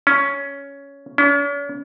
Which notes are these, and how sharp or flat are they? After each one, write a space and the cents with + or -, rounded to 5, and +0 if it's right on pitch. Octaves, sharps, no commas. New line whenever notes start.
C#4 +10
C#4 +45